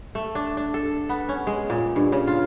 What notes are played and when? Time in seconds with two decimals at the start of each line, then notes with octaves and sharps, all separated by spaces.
0.15 A3
0.35 D4
0.57 D4
0.74 A4
1.09 B3
1.29 C#4
1.47 G#3
1.70 A#2
1.96 G2
2.12 C#3
2.27 F4